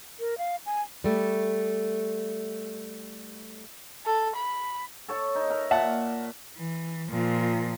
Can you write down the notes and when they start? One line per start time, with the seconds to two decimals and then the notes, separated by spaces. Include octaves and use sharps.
0.20 A#4
0.38 F5
0.66 G#5
1.04 G3 A3
4.06 A4
4.36 B5
5.09 A4 C#5 A5
5.35 D#4
5.50 A#4 E5
5.71 A#2 E5 F#5 A5
6.58 E3
7.10 A#2 F3